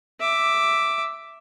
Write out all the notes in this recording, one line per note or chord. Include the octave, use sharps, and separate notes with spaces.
E5 D6